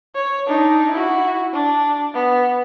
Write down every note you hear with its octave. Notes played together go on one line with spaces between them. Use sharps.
C#5
D4 D#4
E4 F#4
D4
B3